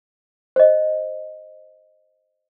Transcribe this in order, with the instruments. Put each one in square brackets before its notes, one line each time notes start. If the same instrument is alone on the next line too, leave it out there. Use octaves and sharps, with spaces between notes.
[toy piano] C5 D#5